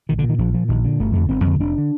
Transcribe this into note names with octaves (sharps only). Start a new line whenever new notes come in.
A#1 D#3
A#2 D3
D#3
A#1 F3
A#2 F3
A#1 D#3
A#2 D3
G1 A3
F2 D3 A3
G1 C4
F2 D3
F1 D4
D3